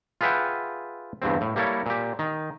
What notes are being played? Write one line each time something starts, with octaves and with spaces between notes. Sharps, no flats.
F4 G#4 B4 E5 F#5 G5
E2 G2 D3 C4
A2
G3 A#3 E4 A4 C#5
A#2 G4
D#3